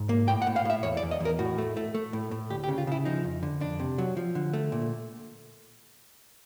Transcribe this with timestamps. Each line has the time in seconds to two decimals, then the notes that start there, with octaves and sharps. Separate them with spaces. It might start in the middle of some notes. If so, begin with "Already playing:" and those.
Already playing: G#2
0.09 A#3
0.28 A2 G5
0.42 F#5
0.47 A2
0.56 F5
0.65 A2 E5
0.83 E2 C#5
0.97 D5
1.03 E2
1.11 D#5
1.20 E2 A#4
1.39 A2 F#4
1.58 A3
1.77 A3
1.94 A3
2.13 A2
2.31 A2
2.50 D2 G4
2.64 G4
2.68 C#3
2.78 F4
2.87 C#3 E4
3.05 F3 D#4
3.24 F2
3.43 D3
3.60 F2 D4
3.80 C3
3.98 F#3
4.17 F3
4.35 D3
4.53 A3
4.72 A#2